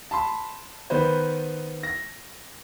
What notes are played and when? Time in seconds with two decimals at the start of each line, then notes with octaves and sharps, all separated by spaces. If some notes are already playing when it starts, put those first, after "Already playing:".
0.11 A5 B5 C6
0.90 D#3 B3 B4 C5
1.83 A#6